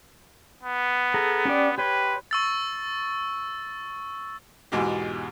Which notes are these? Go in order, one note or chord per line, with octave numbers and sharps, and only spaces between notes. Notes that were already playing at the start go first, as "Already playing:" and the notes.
B3
G#4 A4 A#5
C#4 G4 D5
G4 B4 C#5 C6
C#6 E6 A6
E2 G#2 B2 G#3 G4